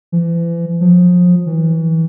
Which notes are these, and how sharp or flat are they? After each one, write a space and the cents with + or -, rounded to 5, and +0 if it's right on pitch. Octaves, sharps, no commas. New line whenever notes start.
E3 +40
F3 +30
E3 -25